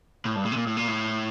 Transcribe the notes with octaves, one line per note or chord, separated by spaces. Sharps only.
A2
G2
A2
C3
A#2
A2
A#2
A2